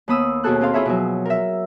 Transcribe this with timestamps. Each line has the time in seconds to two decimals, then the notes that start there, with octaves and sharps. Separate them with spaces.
0.08 D#2 B3 B5 D#6 E6
0.44 D#2 B2 F#4 G#4 A4 F#6
0.61 C4 G#4 A4 F5 C6
0.73 E4 F4 G#4 C#5 E5 B5
0.85 B2 F3 F#3
1.26 A#4 E5